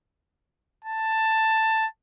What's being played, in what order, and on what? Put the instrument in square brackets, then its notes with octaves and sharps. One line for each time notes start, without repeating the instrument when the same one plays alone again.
[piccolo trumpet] A5